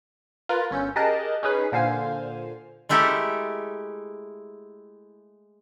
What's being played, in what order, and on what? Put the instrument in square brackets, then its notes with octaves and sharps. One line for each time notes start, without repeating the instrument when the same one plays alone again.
[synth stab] F4 A#4 B4
G1 C#4 E6 G6
G4 G#4 A#4 D#5 A5 F#6
C#4 D#4 G#4 B4
A#2 D3 C5 F5 G#5
[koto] G#3 A3 E4 G4 A4 A#4